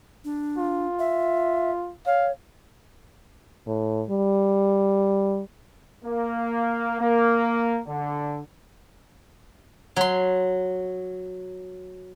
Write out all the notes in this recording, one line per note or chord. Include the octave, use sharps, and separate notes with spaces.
D4
F4
E5
C#5 F5
A2
G3
A#3
A#3
D3
F#3 C6